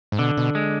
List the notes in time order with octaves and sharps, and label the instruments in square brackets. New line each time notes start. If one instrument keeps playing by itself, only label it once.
[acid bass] G#2
[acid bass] B2 [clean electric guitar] D3
[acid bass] B2
[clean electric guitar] G#3